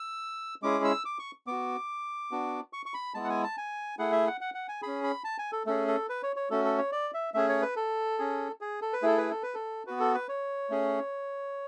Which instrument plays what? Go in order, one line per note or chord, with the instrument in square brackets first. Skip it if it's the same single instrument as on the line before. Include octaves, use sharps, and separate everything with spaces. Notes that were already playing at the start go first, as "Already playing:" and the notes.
Already playing: [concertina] E6
G#3 C#4 E4 G#4 D6
E6
D6
C#6
B3 F#4 D6
B3 D4 F#4
C#6
C#6
B5
G#3 B3 E4 A5
F#5
G#5
A5
G#5
A3 E4 G#4 F#5
E5
F#5
F#5
F#5
G#5
C#4 G#4 B5
B5
A5
G#5
A4
A3 C#4 G#4 A4
A4
B4
C#5
C#5
A3 C#4 F#4 A4
A4
C#5
D5
E5
A3 C#4 G#4 E5
C#5
B4
A4
C#4 G#4
G#4
A4
B4
A3 E4 G#4 A4
B4
A4
B4
A4
B3 F#4 B4
A4
B4
C#5
A3 C#4 G#4